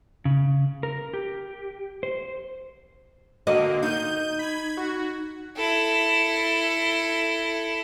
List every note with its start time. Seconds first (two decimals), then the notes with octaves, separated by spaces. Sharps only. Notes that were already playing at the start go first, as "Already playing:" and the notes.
0.25 C#3
0.83 A#4
1.14 G4
2.03 C5
3.47 D3 A#3 F#4 D#5
3.83 D#4 G6 D#7
4.39 B5 G#6
4.77 F#4
5.57 E4 A4